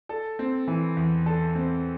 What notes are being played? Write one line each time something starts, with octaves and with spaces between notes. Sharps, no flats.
A4
C4
E3
E2
A4
C4